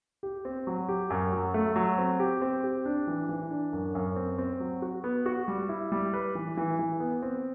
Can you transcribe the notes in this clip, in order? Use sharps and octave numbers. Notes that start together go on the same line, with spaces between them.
G4
C4
F#3
G4
F#2
F#3
A3
F#3
C4
G4
C4
G4
D4
E3
E3
D4
F#2
F#2
C4
C4
F#3
F#4
B3
F#4
G3
E4
G3
B4
E3
E3
E3
B3
C4